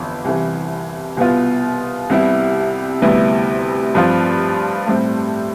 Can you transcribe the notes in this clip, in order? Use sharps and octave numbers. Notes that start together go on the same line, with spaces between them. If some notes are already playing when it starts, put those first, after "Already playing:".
Already playing: G1 F2 E3
C2 C3 E3
C2 B2 B3 F4
C2 C3 G3 B3 E4
D2 C3 G3 B3 E4
G2 F3 C4 F4
A2 G3 C4